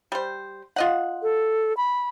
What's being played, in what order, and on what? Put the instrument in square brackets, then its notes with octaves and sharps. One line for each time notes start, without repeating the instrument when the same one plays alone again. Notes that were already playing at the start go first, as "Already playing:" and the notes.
[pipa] G3 C5
F4 D#5 F#5
[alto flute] A4
B5